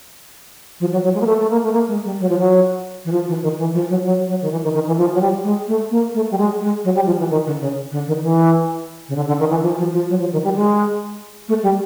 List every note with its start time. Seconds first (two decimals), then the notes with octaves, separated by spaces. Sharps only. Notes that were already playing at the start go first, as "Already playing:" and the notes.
0.80 F3
0.92 F#3
1.04 F#3
1.14 G#3
1.21 A#3
1.26 A3
1.39 A3
1.50 A#3
1.63 A3
1.72 A#3
1.88 G#3
2.04 G3
2.20 F#3
2.28 F3
2.38 F#3
3.05 E3
3.11 F3
3.28 E3
3.43 D#3
3.58 E3
3.73 F3
3.89 F#3
4.04 F#3
4.28 F#3
4.41 D#3
4.51 E3
4.63 D#3
4.74 D#3
4.86 E3
4.98 F3
5.14 F#3
5.21 G3
5.43 G#3
5.67 A3
5.90 A#3
6.14 A3
6.31 G3
6.38 G#3
6.61 G#3
6.84 F#3
6.95 G3
7.06 F3
7.19 E3
7.30 D#3
7.45 D3
7.60 C#3
7.91 D3
8.07 D#3
8.22 E3
9.08 C#3
9.16 D3
9.27 D3
9.39 D#3
9.50 E3
9.63 F3
9.78 F3
9.93 F3
10.09 F#3
10.20 F3
10.32 D#3
10.44 G3
10.55 G#3
11.48 A3
11.63 G3